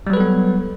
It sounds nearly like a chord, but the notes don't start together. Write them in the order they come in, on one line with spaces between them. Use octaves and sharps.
G3 F#3 B4 A4 B3